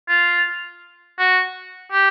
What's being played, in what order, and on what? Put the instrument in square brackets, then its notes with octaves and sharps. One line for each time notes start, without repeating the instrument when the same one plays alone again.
[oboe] F4
F#4
G4